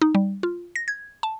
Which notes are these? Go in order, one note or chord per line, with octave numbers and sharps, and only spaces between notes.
D#4
G3
F4
A#6
G#6
A5